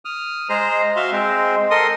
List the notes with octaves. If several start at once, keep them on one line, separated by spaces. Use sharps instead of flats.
D#6 F6
G#3 G#4 C5 A#5
F#4 E5 F5 C6
G#3 C4
A4 A#4 D#5 C6 D#6